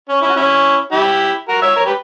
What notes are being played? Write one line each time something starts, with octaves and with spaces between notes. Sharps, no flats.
C#4
C#4 E4
F#4
C#4 E4
E4 G4
F#4 A#4
C#5 E5
A#4 C#5
G4 B4